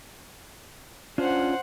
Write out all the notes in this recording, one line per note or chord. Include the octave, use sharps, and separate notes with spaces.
C#4 D4 F4 C5 F#5